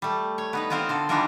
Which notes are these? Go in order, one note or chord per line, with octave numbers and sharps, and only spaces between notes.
G3 A3
C#5
B3 D#4 B4
B3 C4 F4 A#4 C5
D3 A4
E3 G3 D4 D#4 F4 A#4